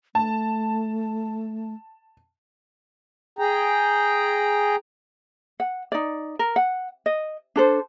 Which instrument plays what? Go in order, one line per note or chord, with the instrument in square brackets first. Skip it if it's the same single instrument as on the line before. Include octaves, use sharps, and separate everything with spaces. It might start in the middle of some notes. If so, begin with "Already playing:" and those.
[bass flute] A3 [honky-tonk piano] A5
[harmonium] G#4 G5 A#5
[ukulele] F#5
D#4 D5
A#4
F#5
D#5
D4 A4 C5